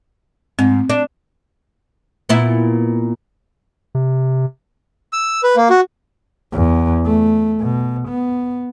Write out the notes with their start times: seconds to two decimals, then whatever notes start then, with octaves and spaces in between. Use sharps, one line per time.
0.59 G#2 C4
0.90 D4
2.29 A#2 B3 E4
3.95 C3
5.13 E6
5.43 B4
5.56 A#3
5.70 F#4
6.53 E2
7.05 A3
7.61 B2
8.08 B3